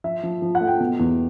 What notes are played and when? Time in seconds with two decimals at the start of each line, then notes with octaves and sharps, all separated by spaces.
0.04 F3 E5
0.23 F3
0.42 F3
0.55 F#5
0.61 A3
0.67 G5
0.80 B2
0.99 E2